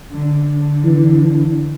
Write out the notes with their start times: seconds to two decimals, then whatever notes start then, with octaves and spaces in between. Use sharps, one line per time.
0.11 D3
0.47 D3
0.84 E3
1.20 E3